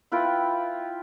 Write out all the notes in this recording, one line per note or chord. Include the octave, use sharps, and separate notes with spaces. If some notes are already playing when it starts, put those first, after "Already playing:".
E4 F4 B4 G5